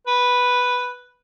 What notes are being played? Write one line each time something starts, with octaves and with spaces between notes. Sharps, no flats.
B4